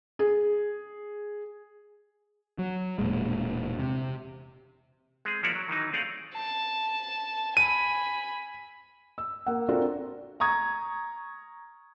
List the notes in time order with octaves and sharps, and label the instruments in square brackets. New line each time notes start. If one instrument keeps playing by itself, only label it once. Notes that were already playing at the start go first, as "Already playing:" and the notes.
[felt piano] G#4
[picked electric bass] F#3
E1 A#2 G#3
C3
[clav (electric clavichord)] G#3 C4 G#4
F3 A#3 E4 F#4 C#5 D5
F#3
D#3 E3 F#3 D#4
A3 C4 G#4 D5 F5 F#5
[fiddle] A5
[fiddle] G#5 B5 [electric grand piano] D#7
[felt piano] E6
A#3 F#5
C4 D4 F4 F#4 A4 A#4
[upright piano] A#5 C#6 D#6 G#6